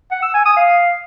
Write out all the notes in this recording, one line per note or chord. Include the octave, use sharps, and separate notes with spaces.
F#5
E6
G#5
D#6
F5